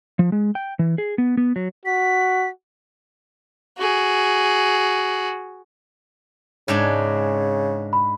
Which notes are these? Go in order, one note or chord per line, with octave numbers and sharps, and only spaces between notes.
F3
G#3
G5
E3
G#4
B3
B3
F#3
F#4 B6
F#4 G#4
G#2 C#3 G#3 D4
B5